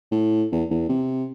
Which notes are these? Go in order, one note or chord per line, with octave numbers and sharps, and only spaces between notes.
A2
E2
E2
C3